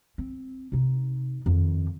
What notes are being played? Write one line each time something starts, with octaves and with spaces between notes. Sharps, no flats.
C4
C3 D#4
F2 D#3